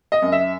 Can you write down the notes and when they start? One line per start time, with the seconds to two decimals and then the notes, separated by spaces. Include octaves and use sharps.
0.12 D#5
0.22 F#2
0.32 E5